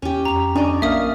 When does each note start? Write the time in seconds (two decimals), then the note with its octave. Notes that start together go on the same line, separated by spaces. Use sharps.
0.02 E2 C#4 G4
0.25 F2 A#5 F7
0.55 C#4 D4 D5 D#5
0.82 A#1 A#3 A#4 E5 F5 D#6